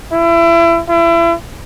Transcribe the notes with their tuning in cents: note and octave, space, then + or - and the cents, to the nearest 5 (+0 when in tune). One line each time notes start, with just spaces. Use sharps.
E4 +30
E4 +35